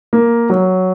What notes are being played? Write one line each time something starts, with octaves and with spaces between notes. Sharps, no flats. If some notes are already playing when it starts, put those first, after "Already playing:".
A#3
F#3